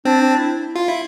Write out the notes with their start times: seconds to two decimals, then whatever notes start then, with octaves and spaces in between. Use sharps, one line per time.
0.05 C4 D4
0.21 D4
0.38 E4
0.75 F4
0.88 E4